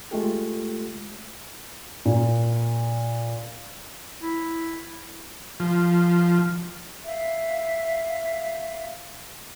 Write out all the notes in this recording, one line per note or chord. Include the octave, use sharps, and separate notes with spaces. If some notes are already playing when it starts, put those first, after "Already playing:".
G#3 A3 F4 G4 A4
A#2
E4
F3
E5 F5